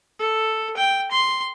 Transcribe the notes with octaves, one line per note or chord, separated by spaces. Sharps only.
A4
G5
C6